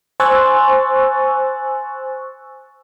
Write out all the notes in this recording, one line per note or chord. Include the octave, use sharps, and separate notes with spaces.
C5 G#5 C#6 E6 F#6 A6